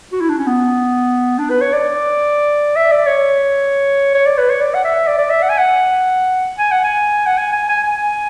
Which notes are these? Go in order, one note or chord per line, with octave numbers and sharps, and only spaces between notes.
F#4
E4
D4
C#4
B3
D4
B4
C#5
D5
E5
D5
C#5
C#5
D5
B4
C#5
D5
F#5
E5
D5
D5
E5
F#5
G#5
F#5
G#5
F#5
G#5
F#5
G#5
G#5
G#5
G#5